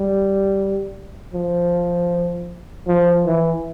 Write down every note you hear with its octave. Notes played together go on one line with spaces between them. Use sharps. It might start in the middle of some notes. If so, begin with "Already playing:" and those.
Already playing: G3
F3
F3
E3